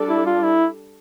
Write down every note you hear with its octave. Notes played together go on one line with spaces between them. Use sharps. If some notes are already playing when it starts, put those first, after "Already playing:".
Already playing: G3 D4 A4 D5
E4
F4
E4